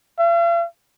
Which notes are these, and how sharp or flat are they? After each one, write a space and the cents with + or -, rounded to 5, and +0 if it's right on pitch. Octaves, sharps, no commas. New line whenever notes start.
F5 -45